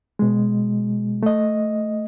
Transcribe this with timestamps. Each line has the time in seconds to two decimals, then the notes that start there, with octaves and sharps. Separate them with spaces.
0.19 B2 G#3
1.23 A3 D#5